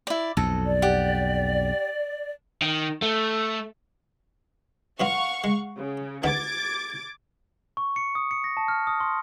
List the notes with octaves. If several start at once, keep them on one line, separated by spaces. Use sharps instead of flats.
E4 D5
B1 F2 A4
D5
G4 F#5
D#3
A3
B2 F#3 F4 F5 F#5 C#6
G#3
C#3
D2 B3 D#4 D6 G#6 A6
C#6
C#7
D#6
C#7
A#6
A5
F6
D#6
C6